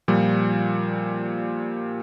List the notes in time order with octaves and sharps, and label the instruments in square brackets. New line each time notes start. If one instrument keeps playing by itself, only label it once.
[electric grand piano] A#2 F3 G3